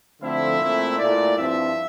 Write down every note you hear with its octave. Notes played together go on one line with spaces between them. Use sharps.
D3 F3 A3 C4 E4 E5
A#2 A3 C4 E4
A#2 A3 E4 D5
G2 F3 C4 E4 E5